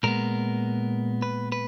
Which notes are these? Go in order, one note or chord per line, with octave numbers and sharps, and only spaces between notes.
A#2 G#3 B3 A#4
B4
B4